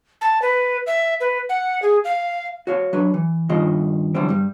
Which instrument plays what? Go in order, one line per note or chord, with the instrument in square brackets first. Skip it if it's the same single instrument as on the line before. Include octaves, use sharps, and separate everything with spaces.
[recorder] A5
B4
E5
B4
F#5
G#4
F5
[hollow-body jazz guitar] F#4 C#5 F5
F#3 D4 B4
E3
G2 D#3 F4 D#5
D3 E3 F#3 G3 C4
G2 G3